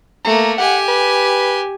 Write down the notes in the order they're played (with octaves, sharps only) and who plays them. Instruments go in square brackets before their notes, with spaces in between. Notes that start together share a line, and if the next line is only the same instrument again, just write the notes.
[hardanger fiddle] A3 A#3 [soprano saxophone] A#5
[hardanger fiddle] G4 G#5 [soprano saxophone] F#5
[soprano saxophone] B4